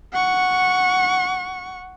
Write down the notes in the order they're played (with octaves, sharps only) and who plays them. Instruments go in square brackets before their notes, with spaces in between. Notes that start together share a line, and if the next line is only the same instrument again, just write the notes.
[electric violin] F#5 C#6